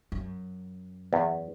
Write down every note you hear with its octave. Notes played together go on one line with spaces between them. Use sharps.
F#2
E2